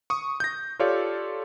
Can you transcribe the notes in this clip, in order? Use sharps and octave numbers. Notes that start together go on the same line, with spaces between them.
C#6 D#6
G6 A#6
F4 G4 A4 C#5 D5 F5